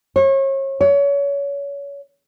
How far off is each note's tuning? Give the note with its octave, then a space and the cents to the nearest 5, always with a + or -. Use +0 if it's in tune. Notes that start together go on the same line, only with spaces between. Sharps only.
C#5 -35
C#5 +30